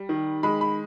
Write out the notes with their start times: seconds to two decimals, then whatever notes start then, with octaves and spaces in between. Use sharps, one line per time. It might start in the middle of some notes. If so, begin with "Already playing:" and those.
Already playing: G3
0.09 D#3
0.43 G#3 B5
0.61 B5